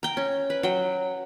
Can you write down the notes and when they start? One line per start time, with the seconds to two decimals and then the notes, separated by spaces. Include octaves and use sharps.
0.03 G5 A#5
0.17 C#4
0.50 B4
0.63 F#3 G5